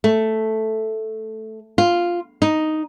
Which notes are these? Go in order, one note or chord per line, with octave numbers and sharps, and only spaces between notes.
A3
F4
D#4